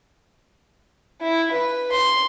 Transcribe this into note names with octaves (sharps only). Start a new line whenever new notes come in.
E4
B4
C6